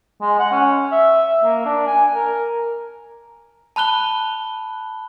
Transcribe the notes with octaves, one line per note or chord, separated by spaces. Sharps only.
G#3
F#5
C#4
E5
A#3
D4
G#5
A#4
A5 B5 F#6 G7